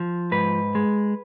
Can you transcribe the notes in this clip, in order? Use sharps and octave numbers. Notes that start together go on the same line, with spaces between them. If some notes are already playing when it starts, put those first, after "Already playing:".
Already playing: F3
G#2 B4
G#3